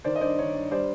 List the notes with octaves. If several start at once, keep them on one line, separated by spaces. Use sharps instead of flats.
D#3 C5 D5
D#5
G2 C5 D5
D#3 C#5
G2
G3 C5 D5